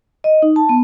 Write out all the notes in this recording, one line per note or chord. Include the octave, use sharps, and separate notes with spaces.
D#5
D#4
A5
B3